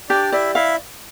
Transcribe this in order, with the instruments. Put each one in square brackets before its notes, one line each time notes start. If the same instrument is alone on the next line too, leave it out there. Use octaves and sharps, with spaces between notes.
[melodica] D4 D5 [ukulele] G4
[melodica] E4 E5 [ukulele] D5
[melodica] E4 E5 [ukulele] F5